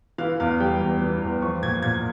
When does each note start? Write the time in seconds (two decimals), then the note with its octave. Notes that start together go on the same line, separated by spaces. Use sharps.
0.18 E3 F5
0.40 E2 F5
0.60 G3 G5
0.81 E2
1.01 E3
1.22 E2
1.42 F3 C#6
1.62 A#2 G#6
1.83 A#2 G#6